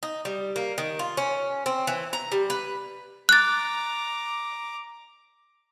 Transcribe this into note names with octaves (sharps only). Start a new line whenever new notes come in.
D#4
G3
A#3
D#3
F4
C#4
C4
E3
A#5
G3
B4
A#5 D6 F#6 A6